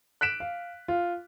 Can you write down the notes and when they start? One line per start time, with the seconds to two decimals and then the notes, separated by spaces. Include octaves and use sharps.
0.21 F#6 B6 D7 E7
0.40 F5
0.88 F4